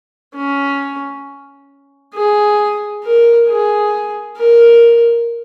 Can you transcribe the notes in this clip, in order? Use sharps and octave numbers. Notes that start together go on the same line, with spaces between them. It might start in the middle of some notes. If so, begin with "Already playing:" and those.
C#4
G#4
A#4
G#4
A#4